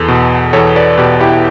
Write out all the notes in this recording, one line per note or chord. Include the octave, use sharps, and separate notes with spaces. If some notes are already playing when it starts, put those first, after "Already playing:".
Already playing: E2 A4
B2
E2 A4 C#5
B4 D5
B2 G4 B4
E4 G4